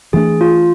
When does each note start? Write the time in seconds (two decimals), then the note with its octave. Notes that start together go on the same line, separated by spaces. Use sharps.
0.13 E3 A3 D4 G#4
0.41 F4